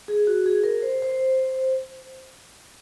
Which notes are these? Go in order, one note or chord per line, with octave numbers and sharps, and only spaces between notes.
G#4
F#4
G#4
A#4
C5
C5